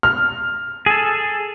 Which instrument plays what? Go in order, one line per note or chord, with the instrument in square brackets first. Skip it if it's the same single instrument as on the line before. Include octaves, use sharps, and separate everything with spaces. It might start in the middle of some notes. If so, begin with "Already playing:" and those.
[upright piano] F6
[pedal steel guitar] G#4 A4